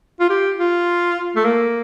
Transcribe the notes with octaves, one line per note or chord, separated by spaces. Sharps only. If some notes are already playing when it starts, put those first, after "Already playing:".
F4
G4
F4
A3
A#3